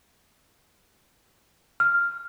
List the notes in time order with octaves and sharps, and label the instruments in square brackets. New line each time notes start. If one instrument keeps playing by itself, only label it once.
[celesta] F6